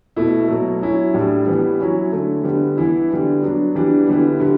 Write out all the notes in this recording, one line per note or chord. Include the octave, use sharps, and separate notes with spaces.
B2 A3 E4
B2 F#3 A3
F#3 C#4 E4
A2 G3 D4
E3 G3 B3
F#3 C#4 E4
D3 A3 C#4 E4
D3 G3 B3
E3 B3 E4
D3 G3 B3 D4
F#3 B3 D4
E3 G3 B3 D4
D3 G3 B3 E4
D3 G3